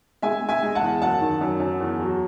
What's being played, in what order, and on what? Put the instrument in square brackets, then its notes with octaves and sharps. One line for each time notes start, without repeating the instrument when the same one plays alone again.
[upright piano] G#3 E5 G#5
G#3
E5 G#5
G#3
F#5 A5
E2
F#2 F#5 A5
D#3
F#2
F#2
E2
F#3